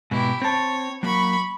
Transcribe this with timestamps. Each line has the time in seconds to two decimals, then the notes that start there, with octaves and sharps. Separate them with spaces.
0.11 G#2 B2 E4 G4
0.42 C4 C#5 A5
1.03 F#3 A#3 B5 C#6